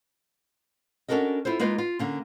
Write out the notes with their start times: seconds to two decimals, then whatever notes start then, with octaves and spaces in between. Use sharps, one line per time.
1.08 C#4 D4 F#4 A4 A#4 D#5
1.45 E4 F4 A4 C5
1.59 G#3 A#3 D#4 F4 B4
1.78 F4
1.99 D3 A#3 C#4